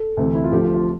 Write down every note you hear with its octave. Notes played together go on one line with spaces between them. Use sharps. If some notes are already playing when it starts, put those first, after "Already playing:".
Already playing: A4
D2 C3 E3
E4
F4
D2 D3 F3 G4
F4
F4